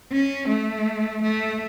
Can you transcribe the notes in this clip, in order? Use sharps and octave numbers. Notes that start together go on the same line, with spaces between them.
C#4
A3
A3